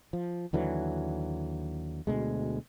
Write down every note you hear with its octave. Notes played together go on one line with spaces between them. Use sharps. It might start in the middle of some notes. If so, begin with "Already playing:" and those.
F3
D#2 D3 E3 F#3
D2 B2 G#3